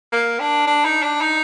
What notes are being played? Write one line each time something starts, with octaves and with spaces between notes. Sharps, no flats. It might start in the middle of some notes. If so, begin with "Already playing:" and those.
A#3
D4
D4
D#4
D4
D#4